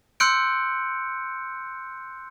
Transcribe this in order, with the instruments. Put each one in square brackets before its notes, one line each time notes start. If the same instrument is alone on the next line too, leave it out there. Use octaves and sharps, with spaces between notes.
[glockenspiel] C6 E6 F#6 G6 C#7 D7